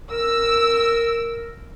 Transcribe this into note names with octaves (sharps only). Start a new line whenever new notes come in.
A#4 E6